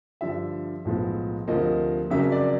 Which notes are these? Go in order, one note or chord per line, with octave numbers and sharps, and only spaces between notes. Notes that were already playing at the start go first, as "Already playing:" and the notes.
G2 D3 F3 E5
B1 A2 F3 G#3 B3
D2 C3 F3 A#3 D#5
F2 C#3 F#3 A#3 E5
D5